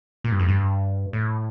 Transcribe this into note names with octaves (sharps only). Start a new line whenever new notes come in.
A#2
G2
F2
G2
A2